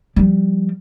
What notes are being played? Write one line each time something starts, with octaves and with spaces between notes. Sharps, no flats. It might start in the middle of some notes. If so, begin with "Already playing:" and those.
F3 G3